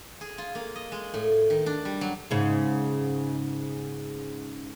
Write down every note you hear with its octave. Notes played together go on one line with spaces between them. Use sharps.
G#4
F4
A#3
D#5
G#3
A2
D#3
D4
G3
F#3
G#2 C#3